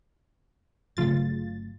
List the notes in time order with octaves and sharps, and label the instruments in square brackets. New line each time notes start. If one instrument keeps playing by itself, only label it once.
[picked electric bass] G1 F#3 A3 [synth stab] C#3 F4 A6